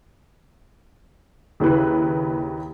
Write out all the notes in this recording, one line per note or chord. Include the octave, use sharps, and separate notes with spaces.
D#2 C#3 E4 B4